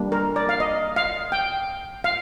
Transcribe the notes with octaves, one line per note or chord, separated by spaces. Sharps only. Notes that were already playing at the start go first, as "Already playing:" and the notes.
Already playing: G3 A#3 D4
A#4
D5
F5
D#5
F5
G5
F5